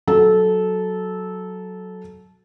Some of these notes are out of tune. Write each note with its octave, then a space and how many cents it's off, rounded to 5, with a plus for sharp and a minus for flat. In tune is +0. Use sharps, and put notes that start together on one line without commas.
F#3 +0 A4 -15